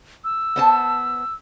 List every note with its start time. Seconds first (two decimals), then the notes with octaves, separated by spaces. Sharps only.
0.24 E6
0.56 B3 C5 A5